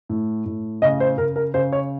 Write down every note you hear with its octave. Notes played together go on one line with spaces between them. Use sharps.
A2
A2
C#3 D#5
C5
C#3 A#4
A#4
C#3 C5
C#5